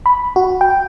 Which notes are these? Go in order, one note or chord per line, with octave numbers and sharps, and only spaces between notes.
B5
F#4
G5